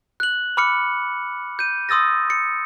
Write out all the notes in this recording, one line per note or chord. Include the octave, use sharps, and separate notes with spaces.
F#6 F#7
B5 D6 F6 C#7
G6 D#7
C6 D#6 E6 A6 A#6
C#7